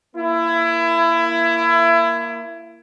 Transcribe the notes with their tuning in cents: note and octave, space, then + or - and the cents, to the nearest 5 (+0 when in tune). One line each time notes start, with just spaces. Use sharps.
A#3 +0 E4 +25